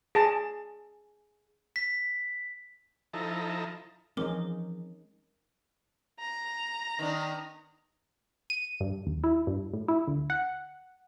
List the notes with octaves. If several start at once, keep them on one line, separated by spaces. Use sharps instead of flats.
G#4 A5
B6
F3 D#4 E4 A4 A#5
E3 F3 G#3 C4 C#4 D#4 A#4 D6
A#5
D#3 B3 D4
D#7
G2
D#2
E4
G2
A2
E4
D2
F#5